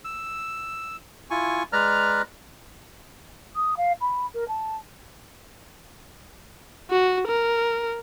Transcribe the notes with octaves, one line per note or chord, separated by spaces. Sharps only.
E6
E4 F4 G#5 C#6
G#3 B4 D5 A#5 F6
D#6
F5
B5
A#4
A5
F#4
A#4